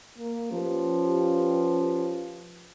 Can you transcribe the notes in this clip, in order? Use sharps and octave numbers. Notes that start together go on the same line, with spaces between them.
A#3
F3 C#4 G4 B4